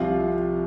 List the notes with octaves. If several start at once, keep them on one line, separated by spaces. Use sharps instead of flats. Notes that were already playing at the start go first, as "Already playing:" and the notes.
Already playing: C2 C3 F3 F4